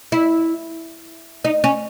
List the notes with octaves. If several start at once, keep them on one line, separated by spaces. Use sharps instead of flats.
E4
D#4
C#4